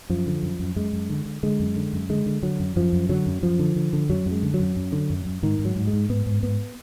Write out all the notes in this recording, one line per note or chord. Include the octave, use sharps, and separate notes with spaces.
F#2 F3
D3
F#2
F#2
F#2 G#3
F#2
D3
D3
D3 G#3
F#2
D3
F#2
D3 G#3
D3
D3 F#3
F#2
F#2 F3
F#2
D3 F#3
F#2
F#2 F3
D3
D3
D3
F#2 F#3
F#2
G#3
D3
F#3
F#2
F#2
D3
F#2
F#2
G#2 D#3
G#2
F#3
G#2
G#3
G#2
G#2 B3
G#2
G#2 B3